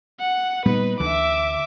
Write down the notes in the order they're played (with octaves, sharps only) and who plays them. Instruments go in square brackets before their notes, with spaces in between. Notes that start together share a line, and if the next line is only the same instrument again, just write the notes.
[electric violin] F#5
[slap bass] A#2 G3 B3 [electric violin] D#4 B4
[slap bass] D2 D3 E3 [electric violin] E5 D6